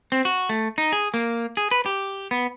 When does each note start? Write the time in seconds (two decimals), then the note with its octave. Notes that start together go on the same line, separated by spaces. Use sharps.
0.12 C4
0.25 F#4
0.49 A3
0.78 D#4
0.92 G#4
1.14 A#3
1.57 G#4
1.71 B4
1.86 G4
2.31 B3